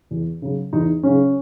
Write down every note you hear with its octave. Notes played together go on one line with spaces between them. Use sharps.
E2
C#3 F#3
E2 D#4
C#3 F#3 C#4